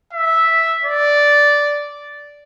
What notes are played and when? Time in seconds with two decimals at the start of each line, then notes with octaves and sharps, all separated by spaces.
0.13 E5
0.85 D5